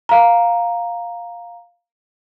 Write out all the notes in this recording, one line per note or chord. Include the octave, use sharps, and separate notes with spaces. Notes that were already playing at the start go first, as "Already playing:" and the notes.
F5 A#5